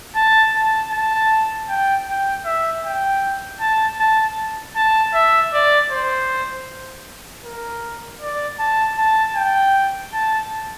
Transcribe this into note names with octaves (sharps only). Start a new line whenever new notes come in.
A5
A5
A5
G5
G5
E5
G5
A5
A5
A5
E5
D5
C5
A#4
D5
A5
A5
G5
A5